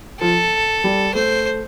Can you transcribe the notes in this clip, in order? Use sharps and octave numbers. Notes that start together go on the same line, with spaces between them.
F3 A4
G3
A3 C5